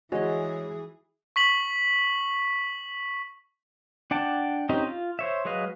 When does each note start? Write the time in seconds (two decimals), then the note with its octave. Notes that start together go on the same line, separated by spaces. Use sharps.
0.12 E3 G#3 F#4 G#4 C#5 D#5
1.36 C#6 B6 F#7
4.11 D4 F#5 G5 A5
4.69 C4 C#4 D#4 G4 D#5
4.87 F4
5.19 C5 C#5 E5
5.45 F#3 G#3 B4 D#5 F5